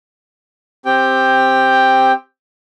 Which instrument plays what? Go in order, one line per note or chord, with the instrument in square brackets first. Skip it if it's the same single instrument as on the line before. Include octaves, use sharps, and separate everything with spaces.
[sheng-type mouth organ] C4 G4 G5